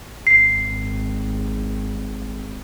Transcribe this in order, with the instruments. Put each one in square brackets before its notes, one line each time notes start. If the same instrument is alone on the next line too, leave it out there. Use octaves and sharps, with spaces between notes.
[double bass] G#1 [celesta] C7